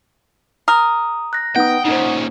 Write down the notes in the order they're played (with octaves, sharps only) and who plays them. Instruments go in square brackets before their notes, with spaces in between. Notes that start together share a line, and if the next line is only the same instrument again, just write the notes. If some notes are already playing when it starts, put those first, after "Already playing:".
[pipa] A#4 [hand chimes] D#6
[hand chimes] F#6 A#6
[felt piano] B3 D#4 [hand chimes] F#5 D#6 [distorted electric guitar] G5
[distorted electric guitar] A#2 C#3 [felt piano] D#4 C5